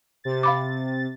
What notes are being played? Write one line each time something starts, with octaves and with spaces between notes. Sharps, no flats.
C3 A6
F5 B5 D6